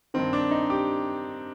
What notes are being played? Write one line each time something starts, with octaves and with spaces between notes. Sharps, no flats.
G2 D#3 C4
D4
D#4
G4